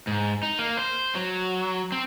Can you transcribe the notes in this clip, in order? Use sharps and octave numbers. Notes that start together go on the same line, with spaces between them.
G#2
D#4
A#3
C5
F#3
C4